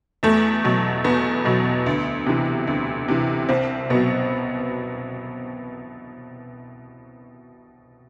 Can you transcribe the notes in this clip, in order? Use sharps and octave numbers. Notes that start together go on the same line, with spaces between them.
E2 A3
B2 F#3
E2 B3
B2 F#3
D2
C3 E3
D2
C3 E3
C2 C4
B2 F#3 B3